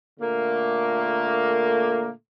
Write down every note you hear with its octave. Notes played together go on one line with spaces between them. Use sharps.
A#2 D3 A3 A#3